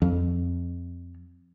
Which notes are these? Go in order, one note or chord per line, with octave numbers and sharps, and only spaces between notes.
F2